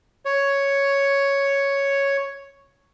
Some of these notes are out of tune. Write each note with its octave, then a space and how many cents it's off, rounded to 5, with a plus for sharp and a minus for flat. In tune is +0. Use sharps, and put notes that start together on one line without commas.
C#5 +0